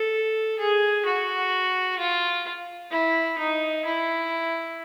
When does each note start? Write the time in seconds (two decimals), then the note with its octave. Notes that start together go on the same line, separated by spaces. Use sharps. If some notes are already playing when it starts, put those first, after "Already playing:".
Already playing: A4
0.59 G#4
1.05 F#4
1.98 F4
2.91 E4
3.38 D#4
3.85 E4